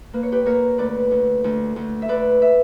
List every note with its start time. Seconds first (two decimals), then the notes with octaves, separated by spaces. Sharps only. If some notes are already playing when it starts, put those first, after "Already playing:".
0.13 A#3 B4
0.23 C#5
0.32 G4 B4
0.46 A#3 A#4 C#5
0.78 D2 B4 D5
1.11 D2
1.44 D2
1.76 D2
2.02 E5
2.08 D2 B4 D5
2.42 E5